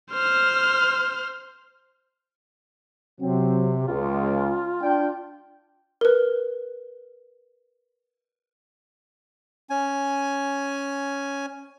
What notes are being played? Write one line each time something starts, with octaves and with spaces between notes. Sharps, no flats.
C5 F6
C3 F#3 C4
C#2 F4
D4 G5
A#4 B4
C#4 G#5